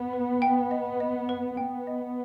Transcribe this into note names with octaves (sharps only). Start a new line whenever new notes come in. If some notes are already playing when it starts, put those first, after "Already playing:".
Already playing: B3
B4
G5
D#5
D#5
B4
B3 G5
D#5